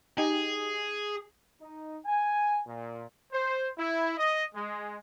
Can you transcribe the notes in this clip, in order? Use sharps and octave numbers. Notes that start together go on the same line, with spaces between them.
D#4 G4 G#4
D#4
G#5
A#2
C5
E4
D#5
G#3